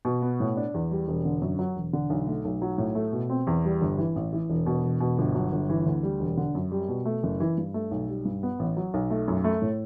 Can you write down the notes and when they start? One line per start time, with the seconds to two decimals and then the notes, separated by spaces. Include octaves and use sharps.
0.05 B2
0.22 B3
0.40 A2
0.57 D4
0.74 E2
0.91 G3
1.08 E1
1.25 D3
1.42 F#2
1.59 F#3
1.76 E1
1.93 D3
2.10 B1
2.27 A3
2.45 B1
2.62 F#3
2.78 A2
2.95 A3
3.13 B2
3.30 C4
3.47 E2
3.65 G3
3.81 G1
3.98 E3
4.16 A1
4.33 E3
4.50 E1
4.66 B2
4.84 E1
5.00 B2
5.18 G1
5.35 F#3
5.52 G1
5.70 E3
5.86 D2
6.03 G3
6.20 E1
6.37 D3
6.55 F#2
6.71 G3
6.88 B2
7.05 A3
7.23 F#1
7.40 E3
7.58 G2
7.74 A3
7.91 B1
8.08 G3
8.25 G2
8.43 B3
8.59 A1
8.77 F#3
8.94 B1
9.10 A3
9.28 F#2
9.44 A3
9.62 A2